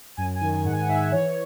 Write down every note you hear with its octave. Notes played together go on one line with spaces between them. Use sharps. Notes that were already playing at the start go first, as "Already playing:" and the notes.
F#2 G#5
G#5
D#3
G#2 F#5
G#5
F#5
G#2 E5
E3 C#5